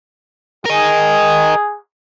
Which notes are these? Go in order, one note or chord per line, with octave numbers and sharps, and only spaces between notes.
G#4 A#4 D#5